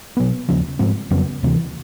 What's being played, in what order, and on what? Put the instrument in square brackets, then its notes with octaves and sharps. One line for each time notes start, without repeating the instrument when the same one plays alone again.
[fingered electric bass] B2 F#3 B3
D#2 C#3 F3
G#2 F3 G#3 C4
F2 C#3 F#3 B3
D2 C3 E3